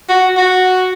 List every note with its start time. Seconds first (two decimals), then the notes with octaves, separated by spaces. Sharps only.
0.09 F#4
0.37 F#4